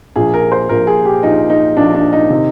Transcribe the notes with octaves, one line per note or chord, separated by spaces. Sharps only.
A#1 A#2 F3 G#4
A#4
C5
A#1 A#2 F3 A#4
G#4
G4
A#1 A#2 F3 D#4
D#4
A#1 A#2 F3 D4
D4
D#4
C3 D#3